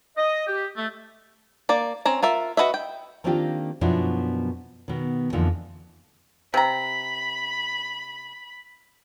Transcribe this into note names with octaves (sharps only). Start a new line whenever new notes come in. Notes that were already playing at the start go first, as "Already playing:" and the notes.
D#5
G4
A3
A#3 D5
C4 C#4 A#5
F4 A#4 E5
F#4 B4 D#5 E5
G5
D#3 A#3 C4 D4 F4 G4
F#2 B2 F3 D4 E4
B2 D#3
F2 D3 E3 F3 A#3 D#4
C3 A#5 B5